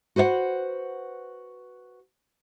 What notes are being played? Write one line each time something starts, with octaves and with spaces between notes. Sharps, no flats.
F#4 B4 C5 D#5 F#5